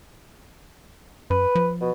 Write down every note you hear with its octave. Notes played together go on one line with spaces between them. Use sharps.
F#2 B4
F3
B2